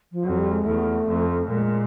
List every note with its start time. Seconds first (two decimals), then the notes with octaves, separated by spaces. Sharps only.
0.12 F3
0.24 F2 F#3
0.38 G3
0.52 G#3
0.65 E2 A3
1.07 F2
1.49 A#2 G#3